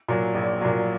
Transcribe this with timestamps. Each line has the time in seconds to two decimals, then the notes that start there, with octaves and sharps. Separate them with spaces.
0.08 A#2 F#3
0.35 A#1
0.61 A#2 F#3